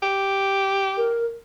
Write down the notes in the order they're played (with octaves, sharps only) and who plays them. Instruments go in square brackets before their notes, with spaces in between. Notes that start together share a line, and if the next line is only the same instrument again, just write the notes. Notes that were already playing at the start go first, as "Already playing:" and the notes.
[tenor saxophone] G4
[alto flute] A#4